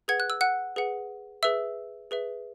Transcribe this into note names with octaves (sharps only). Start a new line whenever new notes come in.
G#4 B4 F#5 G#6
F#6
E6
F#5 F#6
G#4 B4 F#5
G#4 B4 E5 E6
G#4 B4 E5